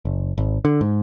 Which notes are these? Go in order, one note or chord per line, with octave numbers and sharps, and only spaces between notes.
F#1
G#1
D3
G#2